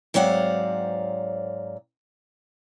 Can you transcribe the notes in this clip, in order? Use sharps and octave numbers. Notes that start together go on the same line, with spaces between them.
G#2 F#3 C4 D5 F5 F#5